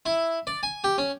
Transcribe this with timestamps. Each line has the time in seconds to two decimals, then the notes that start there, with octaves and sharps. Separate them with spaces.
0.06 E4
0.47 D5
0.63 G#5
0.84 G4
0.98 C#4